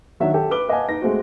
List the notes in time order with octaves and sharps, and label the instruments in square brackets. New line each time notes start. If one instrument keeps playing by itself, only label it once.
[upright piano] D#3 F#3 D4 C#5 E5 F#5
G4 A4 G5
B4 D6 G7
B4 D#5 F5 F#5 G#5 A5
D#4 B4 A#6
G#3 A3 C4 F#4